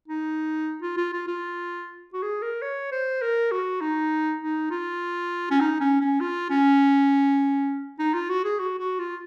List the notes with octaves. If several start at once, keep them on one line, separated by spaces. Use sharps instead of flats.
D#4
F4
F4
F4
F4
F#4
G#4
A#4
C#5
C5
A#4
F#4
D#4
D#4
F4
C#4
D#4
C#4
C#4
F4
C#4
D#4
F4
F#4
G#4
F#4
F#4
F4